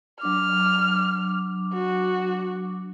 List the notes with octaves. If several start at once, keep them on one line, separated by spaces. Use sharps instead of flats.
F#3 D4 D6 F6
F#4